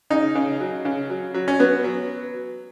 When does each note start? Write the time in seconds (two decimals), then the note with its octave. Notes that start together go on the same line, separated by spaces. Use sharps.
0.10 C#3 D#4
0.35 C#3
0.60 F#3
0.85 C#3
1.10 F#3
1.34 F#3
1.48 C#4
1.59 F#3 B3
1.84 F#3